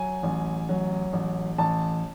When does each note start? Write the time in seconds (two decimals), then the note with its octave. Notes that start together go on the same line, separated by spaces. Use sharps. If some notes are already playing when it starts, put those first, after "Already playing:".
Already playing: F#3 G#5
0.23 A1
0.69 F#3
1.13 A1
1.58 A1 A5